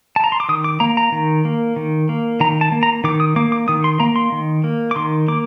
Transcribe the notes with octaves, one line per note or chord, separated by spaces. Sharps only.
A5
A#5
C6
D6
D#3 D#6
D6
A#3 A#5
A#5
D#3
A#3
D#3
A#3
D#3 A#5
A5
A#3
A#5
D#3 D6
D#6
A#3 D6
D6
D#3 D#6
C6
A#3 A#5
C6
D#3
A#3
D6
D#3 C6
A#3 D6